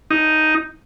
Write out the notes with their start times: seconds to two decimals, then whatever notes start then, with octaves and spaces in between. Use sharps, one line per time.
0.11 D#4